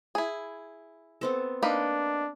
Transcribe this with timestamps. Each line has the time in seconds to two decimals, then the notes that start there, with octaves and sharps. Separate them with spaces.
0.15 E4 G#4
1.21 B3 C4 A4
1.63 A#3 D4 D#4 B4